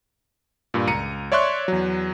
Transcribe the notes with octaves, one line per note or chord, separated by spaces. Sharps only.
G2 A#2
C#2 A#5 C#7 D#7
C#5 D5 E5 C6 C#6 F#6
E2 F#3